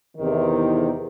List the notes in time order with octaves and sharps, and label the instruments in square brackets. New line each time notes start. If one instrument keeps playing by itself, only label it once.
[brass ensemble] E2 C3 D#3